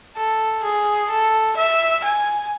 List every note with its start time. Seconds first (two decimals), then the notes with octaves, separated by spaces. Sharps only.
0.16 A4
0.63 G#4
1.10 A4
1.57 E5
2.04 G#5